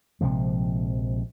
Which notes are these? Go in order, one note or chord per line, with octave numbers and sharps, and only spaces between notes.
A#1 C3 F3 G#3